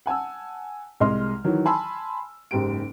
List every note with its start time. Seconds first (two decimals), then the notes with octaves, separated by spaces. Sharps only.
0.06 F#5 G#5 A5 E6
1.00 C2 G#3 D#5 C6 F6
1.44 D#3 E3 F#3
1.66 G#5 A5 B5 C6 E6
2.51 F#1 G#2 G4 D7